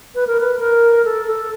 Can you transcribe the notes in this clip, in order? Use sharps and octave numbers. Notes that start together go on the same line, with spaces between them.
B4
A#4
B4
A#4
A4
A4